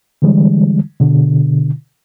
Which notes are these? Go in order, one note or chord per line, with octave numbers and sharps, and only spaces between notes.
D3 E3 G3 G#3
B2 D3